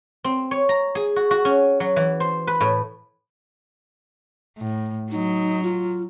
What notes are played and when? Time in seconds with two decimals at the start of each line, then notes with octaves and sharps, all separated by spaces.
0.24 C4
0.51 C#5
0.69 A#5
0.95 G#4
1.16 F#4
1.31 F#4
1.45 C#4
1.80 F#3
1.96 E3
2.20 C5
2.47 B4
2.61 A2
4.58 A2
5.11 F#3 D#4
5.63 F4